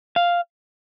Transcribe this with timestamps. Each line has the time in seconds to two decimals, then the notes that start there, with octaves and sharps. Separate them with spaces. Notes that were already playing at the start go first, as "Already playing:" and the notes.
0.16 F5